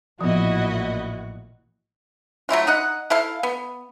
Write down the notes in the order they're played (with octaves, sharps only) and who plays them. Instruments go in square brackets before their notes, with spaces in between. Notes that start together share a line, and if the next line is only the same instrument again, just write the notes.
[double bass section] A1 A#2 [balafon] F3 B3 [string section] E4 D#5 [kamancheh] F#4
[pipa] F#3 A3 E4 F4
D#4 D#5 F#5
E4 A4 F5
B3